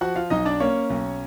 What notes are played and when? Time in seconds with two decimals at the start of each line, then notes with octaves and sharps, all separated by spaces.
0.01 F3 F#4 F#5
0.16 F4 F5
0.30 B1 D#4 D#5
0.45 D4 D5
0.60 A#3 C#4 C#5
0.90 B1